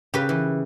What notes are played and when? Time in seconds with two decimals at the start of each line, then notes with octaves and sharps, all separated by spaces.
0.14 C#3 G4 B4
0.29 E3